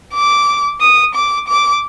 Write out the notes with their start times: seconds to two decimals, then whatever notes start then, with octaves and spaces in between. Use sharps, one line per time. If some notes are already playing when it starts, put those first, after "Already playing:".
0.14 D6
0.81 D#6
1.15 D6
1.48 D6